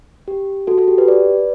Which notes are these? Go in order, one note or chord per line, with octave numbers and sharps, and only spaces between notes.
G4
F#4 A4
F#4 A4
G4
G4 B4
B4 D5